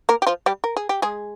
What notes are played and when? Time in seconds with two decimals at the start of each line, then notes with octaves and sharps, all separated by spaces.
0.09 A#3 A#4
0.22 G4
0.27 F3 F4
0.46 G3 G4
0.64 A#4
0.77 G#4
0.89 G4
1.02 G#3 G#4